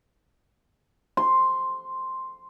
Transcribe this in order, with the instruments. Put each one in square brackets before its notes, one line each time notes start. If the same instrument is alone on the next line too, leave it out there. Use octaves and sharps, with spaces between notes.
[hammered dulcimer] C6